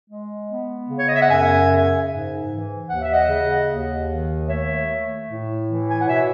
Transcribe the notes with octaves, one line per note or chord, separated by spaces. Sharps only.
G#3
B3
C#3
C#5
D#5
E5
F#5
F#2 E5 G#5
C#3
G#2
E3
D#2 F#5
E5
D#5 F#5
C#3
D#2
D#3
A3 C#5 E5
A3
A2
E3
G#5
F#5
B2 C#5 E5